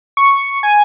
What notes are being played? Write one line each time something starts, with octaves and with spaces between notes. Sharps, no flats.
C#6
G#5